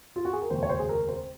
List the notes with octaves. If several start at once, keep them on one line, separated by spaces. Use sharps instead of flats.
F4
F#4
G#4
A#4
F1 D#2 C#3 G#3 C5
C#5
C5
G#4
A#4
C5